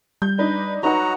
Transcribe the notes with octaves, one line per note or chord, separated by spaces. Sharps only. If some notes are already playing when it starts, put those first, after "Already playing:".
G3 G6
D4 D#4 B4
F#3 D#4 F#4 B4 F#5 A#5